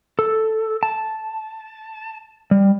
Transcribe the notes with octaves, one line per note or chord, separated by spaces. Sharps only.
A4
A5
G3